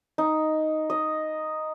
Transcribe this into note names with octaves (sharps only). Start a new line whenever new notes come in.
D#4
D#5